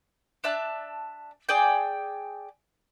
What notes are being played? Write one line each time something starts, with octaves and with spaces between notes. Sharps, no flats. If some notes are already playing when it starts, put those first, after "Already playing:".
D4 E5 A5 F#6
G#4 D5 G5